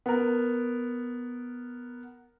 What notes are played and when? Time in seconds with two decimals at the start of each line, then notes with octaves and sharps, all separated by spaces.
0.06 B3 A#4